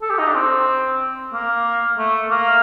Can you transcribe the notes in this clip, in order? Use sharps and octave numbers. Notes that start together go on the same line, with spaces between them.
A4
G4
D#4
D4
C4
A#3
A3
A#3